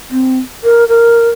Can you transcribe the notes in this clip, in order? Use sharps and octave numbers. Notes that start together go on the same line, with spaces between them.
C4
A#4
A#4